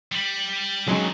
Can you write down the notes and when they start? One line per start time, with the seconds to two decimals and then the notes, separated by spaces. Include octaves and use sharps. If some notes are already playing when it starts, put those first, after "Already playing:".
0.12 G3
0.88 D2 D#3 F#3 G#3 C#4